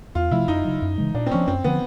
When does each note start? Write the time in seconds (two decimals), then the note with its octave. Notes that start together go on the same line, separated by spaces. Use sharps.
0.15 E2 F4
0.31 C3 F3 A3 E4
0.48 F#2 D#4
0.64 C#3 F#3
0.82 F#2
0.98 C#3 E3 G#3
1.14 A#2 D4
1.26 C4
1.31 F3 G#3 B3 C#4
1.47 F#2 C4
1.64 D3 F3 B3